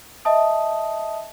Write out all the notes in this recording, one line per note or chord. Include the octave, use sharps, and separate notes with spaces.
D#5 E5 A5 D#6